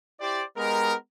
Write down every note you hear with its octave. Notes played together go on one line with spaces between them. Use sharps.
E4 G4 C5 D5
G#3 B3 D#4 G4 A#4